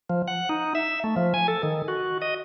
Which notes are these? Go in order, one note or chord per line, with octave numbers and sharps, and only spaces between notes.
F3
F#5
D#4
E5
A3
F3
G#5
A4
D#3
F#4
D#5